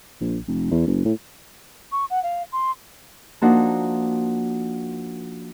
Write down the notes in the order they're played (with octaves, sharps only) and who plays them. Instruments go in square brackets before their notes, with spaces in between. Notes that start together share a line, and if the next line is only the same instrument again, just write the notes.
[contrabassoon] A#1
F1
E2
F#1
A2
[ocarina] C#6
F#5
F5
C6
[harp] F3 A#3 D4 D#4 F#4